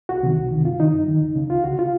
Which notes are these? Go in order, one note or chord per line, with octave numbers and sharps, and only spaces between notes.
C2 F#4
C3 D#3
C2
C3 D#3
F#2 F4
D#3 D#4
F#2
D#3
C#2
C#3
C#2 F4
C#3 F#4
F4